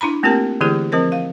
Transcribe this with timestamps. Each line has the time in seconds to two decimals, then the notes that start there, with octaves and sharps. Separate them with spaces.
0.01 D4 E4 A#5 B5
0.23 A3 A#3 C4 F4 G4 A#4
0.61 D3 E3 A3 E4 G4 G#4
0.92 F3 C4 A#4 C5
1.12 F5